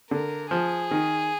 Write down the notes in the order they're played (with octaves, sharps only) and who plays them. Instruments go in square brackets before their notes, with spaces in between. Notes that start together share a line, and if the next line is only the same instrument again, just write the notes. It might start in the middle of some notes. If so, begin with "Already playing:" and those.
[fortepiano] D3 [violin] A#4
[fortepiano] F3 [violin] G#4
[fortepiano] D#3